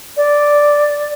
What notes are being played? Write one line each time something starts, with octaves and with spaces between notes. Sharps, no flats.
D5